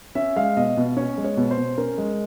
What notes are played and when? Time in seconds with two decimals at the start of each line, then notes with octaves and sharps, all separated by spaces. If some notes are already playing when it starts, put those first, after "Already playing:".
0.15 C#4 E5
0.36 G#3 F5
0.57 B2 D#5
0.77 B2
0.97 C#4 C#5
1.18 G#3
1.24 C#5
1.37 B2
1.51 C5
1.58 B2
1.78 C#4 A#4
1.98 G#3